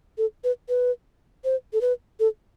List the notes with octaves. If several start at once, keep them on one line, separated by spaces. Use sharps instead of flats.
A4
B4
B4
C5
A4
B4
A4